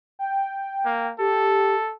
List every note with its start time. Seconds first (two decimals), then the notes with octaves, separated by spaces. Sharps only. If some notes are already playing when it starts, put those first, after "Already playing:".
0.19 G5
0.85 A#3
1.19 G4 A4